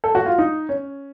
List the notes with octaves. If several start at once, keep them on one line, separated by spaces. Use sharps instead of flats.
A4
F#4
F4
D#4
C#4